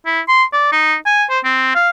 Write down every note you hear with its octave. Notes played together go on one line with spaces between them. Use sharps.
E4
C6
D5
D#4
G#5
C5
C4
F5